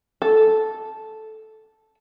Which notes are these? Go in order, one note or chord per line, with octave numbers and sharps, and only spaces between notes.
A4